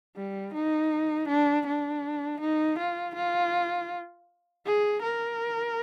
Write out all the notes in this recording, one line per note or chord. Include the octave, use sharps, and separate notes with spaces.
G3
D#4
D4
D4
D#4
F4
F4
G#4
A#4